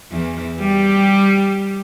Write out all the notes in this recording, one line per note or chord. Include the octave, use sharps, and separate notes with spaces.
E2 E3
G3 G4